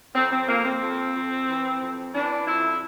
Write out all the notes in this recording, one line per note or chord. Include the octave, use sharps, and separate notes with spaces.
F2 C4
C4
F2 A#3
C4
F2
F2
E3
F2
E3 D4
F2 E4